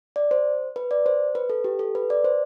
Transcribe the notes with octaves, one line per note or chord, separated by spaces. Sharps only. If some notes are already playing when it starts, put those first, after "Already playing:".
D5
C5
B4
D5
C5
B4
A4
G4
A4
B4
D5
C5